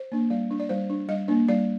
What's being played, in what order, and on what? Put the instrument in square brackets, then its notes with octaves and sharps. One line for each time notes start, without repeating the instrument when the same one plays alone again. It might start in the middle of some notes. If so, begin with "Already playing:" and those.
Already playing: [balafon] C5
A#3 D4
G3 D5
D4
D5
G3 C5
D4
G3 D#5
A#3 D4
G3 D5